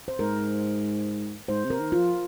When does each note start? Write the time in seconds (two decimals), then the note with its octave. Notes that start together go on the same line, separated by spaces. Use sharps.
0.08 C5
0.19 G#2 A#4
1.48 G#2 C5
1.65 C3
1.70 A#4
1.81 D#3
1.92 F4
1.97 F3